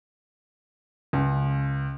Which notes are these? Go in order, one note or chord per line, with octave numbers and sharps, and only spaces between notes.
C#2